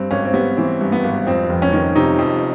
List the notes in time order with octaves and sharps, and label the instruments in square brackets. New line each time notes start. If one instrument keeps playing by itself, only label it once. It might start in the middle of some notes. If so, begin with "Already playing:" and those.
Already playing: [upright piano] G2 C4
G#1 C#4
C4
G3 B3
E3 C4
G2
B3
G#1
F2 C4
F1
C#4
D#3
C3 D#4
F2